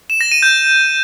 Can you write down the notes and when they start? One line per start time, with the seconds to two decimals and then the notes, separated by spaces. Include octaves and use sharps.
0.10 E7
0.21 A#6
0.32 D#7
0.42 G6